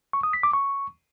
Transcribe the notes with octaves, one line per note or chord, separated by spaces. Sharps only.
C#6
D#6
B6
D6
C#6